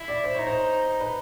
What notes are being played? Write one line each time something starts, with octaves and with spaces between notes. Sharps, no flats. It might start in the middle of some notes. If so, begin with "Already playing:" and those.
Already playing: E4
D5
C5
D#4 C#5
C5
B4